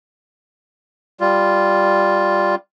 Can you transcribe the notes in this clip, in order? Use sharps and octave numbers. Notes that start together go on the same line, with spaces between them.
G3 F4